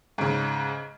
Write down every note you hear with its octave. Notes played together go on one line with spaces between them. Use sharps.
G#2 C#3